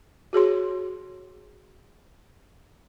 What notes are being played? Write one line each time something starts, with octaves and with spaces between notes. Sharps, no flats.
F#4 G#4 C#5 C6